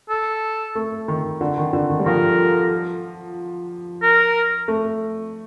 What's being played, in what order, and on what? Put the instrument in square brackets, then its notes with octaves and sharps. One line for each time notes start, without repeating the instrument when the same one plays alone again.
[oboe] A4
[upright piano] A3
D#3
D3
D#3
D3
D#3
G3
[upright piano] F3 [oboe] A#4
[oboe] A#4
[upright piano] A3